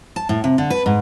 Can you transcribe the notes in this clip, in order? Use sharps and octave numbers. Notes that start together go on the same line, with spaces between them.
A5
A2
C3
D3
B4
G#2